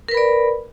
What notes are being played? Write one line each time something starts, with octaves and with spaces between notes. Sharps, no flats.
A#4 B4 D5 B5